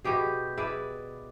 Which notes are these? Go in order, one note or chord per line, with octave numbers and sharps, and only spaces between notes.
B2 E4 G4 G#4
E4 G#4 B4 D5